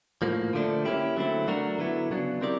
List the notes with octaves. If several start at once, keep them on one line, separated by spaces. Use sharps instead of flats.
A2 F3 A#3
D3 F3 A3 D4
A#3 C#4 E4 G4
D3 F#3 A3 C4 E4
F#3 A3 D4 F#4 A#4
D3 F#3 B3 E4
C#3 F#3 B3 D4
C4 E4 G4 A#4 D5